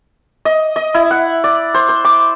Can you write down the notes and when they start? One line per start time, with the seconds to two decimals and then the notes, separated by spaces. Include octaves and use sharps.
0.45 D#5
0.76 D#5
0.94 E4
1.11 F#5
1.44 D5
1.74 C5
1.89 C5
2.05 D6